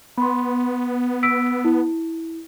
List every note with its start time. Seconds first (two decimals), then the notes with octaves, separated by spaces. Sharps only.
0.17 B3 B5 C6
1.23 E6 B6 D7
1.65 E4